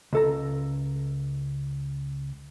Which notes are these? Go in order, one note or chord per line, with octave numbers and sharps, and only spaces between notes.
C#2 A4 A#5